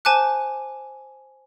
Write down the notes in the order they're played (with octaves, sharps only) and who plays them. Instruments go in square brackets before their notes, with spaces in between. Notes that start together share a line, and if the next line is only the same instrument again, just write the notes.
[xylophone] C5 G#5 A5 D6 F#6